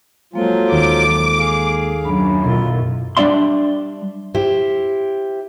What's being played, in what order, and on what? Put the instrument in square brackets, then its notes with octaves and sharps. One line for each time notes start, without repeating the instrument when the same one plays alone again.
[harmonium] F3 F#3 F4 [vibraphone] G#3 A#3 A4
[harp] D#2 [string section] D6
[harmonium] G#4 F5
[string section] F#2 [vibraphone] D4 [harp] B5
[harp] B1 E4 [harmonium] F4 [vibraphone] A#4 F5
[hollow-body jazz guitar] G3 D4 D5 E5 C6
[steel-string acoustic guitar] E4 G4 C5